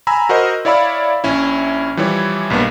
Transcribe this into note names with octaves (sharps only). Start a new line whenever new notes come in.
G#5 A#5 B5 E6
F#4 A#4 C5 D#5
E4 C#5 D5 F5 B5 E6
A#1 C#4 E4
E3 F3 G3 E4 C#5
B1 G2 A#3 B3